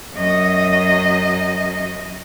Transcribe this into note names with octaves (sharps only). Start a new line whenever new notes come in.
F#2 D#5